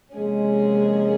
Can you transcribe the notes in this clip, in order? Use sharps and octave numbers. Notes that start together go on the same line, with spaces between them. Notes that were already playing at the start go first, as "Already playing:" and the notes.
C3 F3 G#3 A#3 C#4 G#4